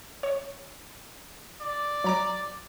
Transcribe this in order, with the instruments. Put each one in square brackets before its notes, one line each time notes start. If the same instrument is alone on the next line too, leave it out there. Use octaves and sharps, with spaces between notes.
[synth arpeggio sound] C#5 C#6
[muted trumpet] D5
[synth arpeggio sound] F#3 A#5 D6